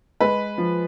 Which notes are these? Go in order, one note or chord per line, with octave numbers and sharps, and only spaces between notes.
G#3 B4
F3